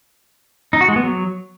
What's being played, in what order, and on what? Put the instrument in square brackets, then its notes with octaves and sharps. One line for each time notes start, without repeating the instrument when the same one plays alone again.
[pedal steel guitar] D#4
F#4
G#3
B3
F#3